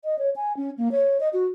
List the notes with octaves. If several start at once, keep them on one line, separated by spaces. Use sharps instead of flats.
D#5
C#5
G#5
C#4
A#3
C#5
D#5
F#4